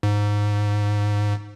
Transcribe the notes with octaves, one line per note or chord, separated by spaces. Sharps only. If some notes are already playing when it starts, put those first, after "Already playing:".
G#2